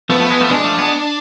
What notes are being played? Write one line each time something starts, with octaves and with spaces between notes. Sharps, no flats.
F3 A3 B3
F3 A3
G#3
F3 A3
G#3 D4
F3 A3
G#3 B3